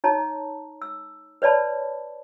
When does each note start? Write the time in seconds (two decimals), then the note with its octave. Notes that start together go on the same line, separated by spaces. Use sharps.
0.04 D#4 C#5 A5 A#5
0.82 E6
1.42 B4 C#5 D5 A5 B5